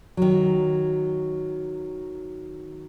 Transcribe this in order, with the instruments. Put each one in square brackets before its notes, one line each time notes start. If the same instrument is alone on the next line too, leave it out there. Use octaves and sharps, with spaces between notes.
[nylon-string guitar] D#3 F#3